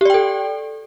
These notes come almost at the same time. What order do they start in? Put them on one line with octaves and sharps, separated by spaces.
G4 D5 G5 A4